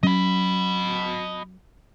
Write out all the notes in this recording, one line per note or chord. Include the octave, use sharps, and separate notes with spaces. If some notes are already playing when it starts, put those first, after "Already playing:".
F#3 C#4 D#5 B5